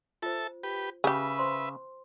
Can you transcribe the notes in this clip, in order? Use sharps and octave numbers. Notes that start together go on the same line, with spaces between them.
F4 A4 C5 E5 A5
G4 B4
C#3 G4 G#4 B4 E5
C5 C6